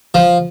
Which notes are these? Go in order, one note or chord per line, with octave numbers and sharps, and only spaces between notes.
F3